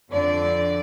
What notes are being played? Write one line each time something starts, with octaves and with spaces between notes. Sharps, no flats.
F2 D3 D5